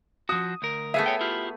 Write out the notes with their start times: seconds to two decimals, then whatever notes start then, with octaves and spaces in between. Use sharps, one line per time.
0.29 F3 F#4 D#6
0.62 D2 A#4
0.94 A3 B3 G#4 E5
1.06 C#5 G5
1.21 E4 F4 G4